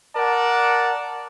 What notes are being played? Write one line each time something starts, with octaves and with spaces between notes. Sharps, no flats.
A#4 D5 F#5 A5